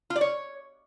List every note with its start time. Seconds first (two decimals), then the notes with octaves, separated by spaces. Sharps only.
0.10 F4
0.16 D5
0.21 C#5